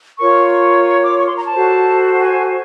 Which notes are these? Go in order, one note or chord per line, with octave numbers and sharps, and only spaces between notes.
F4 A#4 C#5 C#6
C#6
C#6
D6
C#6
C6
A#5
A5
F#4 A4 C5
G#5